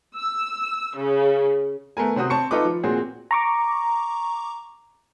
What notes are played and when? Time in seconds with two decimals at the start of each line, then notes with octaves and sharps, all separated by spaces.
0.16 E6
0.96 C#3
1.97 A3 B3 A#4 G#5
2.16 C3 C4 F#4 D#6
2.30 C4 A5 C#6 C#7
2.51 D#4 F4 A4 B4 D6
2.64 F3
2.83 A#2 C4 F#4 G#4
3.31 A#5 C#6 D6